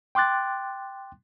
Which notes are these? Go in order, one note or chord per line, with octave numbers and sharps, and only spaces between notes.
G5 C6 D6 F#6 A6